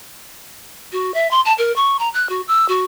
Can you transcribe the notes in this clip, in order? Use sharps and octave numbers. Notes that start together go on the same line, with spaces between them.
F#4
E5
C6
A5
A#4
C#6
A#5
F#6
F#4
E6
F#4